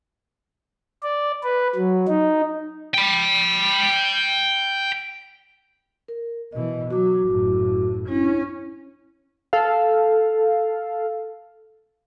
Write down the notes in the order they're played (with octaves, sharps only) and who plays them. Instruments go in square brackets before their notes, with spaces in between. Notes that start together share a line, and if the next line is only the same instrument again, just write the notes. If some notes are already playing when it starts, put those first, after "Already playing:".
[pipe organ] D5
B4
F#3
D#4
[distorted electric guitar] G5 B5
[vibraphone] A#4
[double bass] B2 E3 [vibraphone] D#5
[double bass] F#3 [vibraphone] F#4 D6
[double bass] F#1 A2
[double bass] C#4 [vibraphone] D4 E4
[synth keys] A4 F5